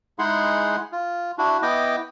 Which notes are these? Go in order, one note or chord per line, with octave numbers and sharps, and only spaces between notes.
G#3 D#4 E4 G#4 F#5 C6
F4
D4 E4 F#4
B3 E4 D#5 G5 D6